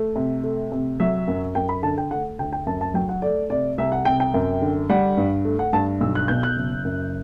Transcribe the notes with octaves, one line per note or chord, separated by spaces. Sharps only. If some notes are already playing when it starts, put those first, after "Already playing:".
Already playing: A3
C3
A3
C3
F#3 E5
F#2
F#2 G5
B5
D3 A5
G5
A3 F#5
D2 G5
G5
F#2 A5
A5
F#3 G5
F#5
A3 D5
C3 D5
C2 E5
F#5
C3 G5
G5
F#2
D3
G3 F#5
G2
A3
F#5
G2 A5
B1 E6
F#6
B2 G6
F#6
F#1
F#2